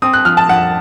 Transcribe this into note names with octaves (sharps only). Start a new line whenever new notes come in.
C4 D#6
F#6
F3 F6
A5
F2 F#5